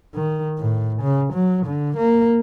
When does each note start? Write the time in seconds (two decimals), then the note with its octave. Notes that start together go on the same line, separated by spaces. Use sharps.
0.15 D#3
0.59 A2
1.02 C#3
1.33 F#3
1.66 D3
1.97 A#3